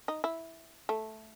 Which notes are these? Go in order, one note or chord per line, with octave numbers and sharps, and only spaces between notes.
D#4
E4
A3